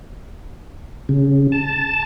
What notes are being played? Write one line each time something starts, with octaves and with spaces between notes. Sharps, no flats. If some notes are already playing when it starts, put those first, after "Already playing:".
C#3
A5